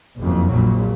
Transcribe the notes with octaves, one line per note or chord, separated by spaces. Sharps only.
F#1 F2
A#1 A#2 F#3